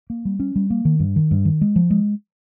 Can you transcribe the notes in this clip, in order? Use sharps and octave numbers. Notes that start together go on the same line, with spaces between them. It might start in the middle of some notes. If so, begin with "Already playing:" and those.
A#3
G3
C#4
G3
A#3
D#3
G2
D#3
G2
D#3
G#3
F3
G#3